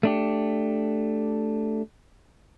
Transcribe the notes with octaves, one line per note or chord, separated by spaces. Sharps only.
A3 D4 G4